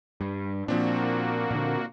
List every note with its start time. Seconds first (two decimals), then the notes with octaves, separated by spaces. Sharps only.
0.21 G2
0.68 A#2 F3 A#3 C4 D4 F#4
1.51 A#2 D3